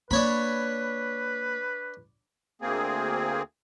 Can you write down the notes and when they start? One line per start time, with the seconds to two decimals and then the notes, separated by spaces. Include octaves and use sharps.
0.11 A#3 D4 B4 C#5 B5
2.62 D2 A#3 C4 G#4